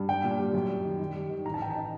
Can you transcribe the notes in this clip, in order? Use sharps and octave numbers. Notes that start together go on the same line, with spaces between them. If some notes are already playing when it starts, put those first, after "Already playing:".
Already playing: G2
G3 G5
A#2
G3
F#2
G3
D#3
D#3
G3
D#3
A1 A#5
A5
A1 G5
A5
D#4